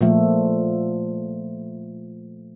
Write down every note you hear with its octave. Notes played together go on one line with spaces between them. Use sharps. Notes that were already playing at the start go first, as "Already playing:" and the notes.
A#2 F3 A3